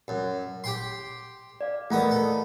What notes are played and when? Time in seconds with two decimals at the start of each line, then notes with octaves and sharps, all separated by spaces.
0.08 F#2
0.64 G4 G5 C6
1.61 D5 F5
1.91 E2 A3 B3 A#4 B5 D#6
2.11 A4